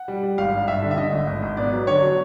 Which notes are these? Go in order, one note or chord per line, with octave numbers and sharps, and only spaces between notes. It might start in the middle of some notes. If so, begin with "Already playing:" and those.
Already playing: F#5
G3
G3
G#1 F5
G2
G2 E5
D3
E5
D3 D#5
G#1
G#1
G#1
B3 D5
F#3
D3 C#5
F#3